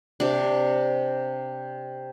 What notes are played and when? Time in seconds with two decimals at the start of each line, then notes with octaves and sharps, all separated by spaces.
0.20 C3 D4